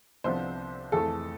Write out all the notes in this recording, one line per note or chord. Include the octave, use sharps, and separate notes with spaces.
C2 C3 F3 B3 D4 C5
F2 E3 A3 A4